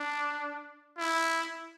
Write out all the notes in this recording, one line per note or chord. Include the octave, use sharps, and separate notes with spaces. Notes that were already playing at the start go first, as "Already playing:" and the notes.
Already playing: D4
E4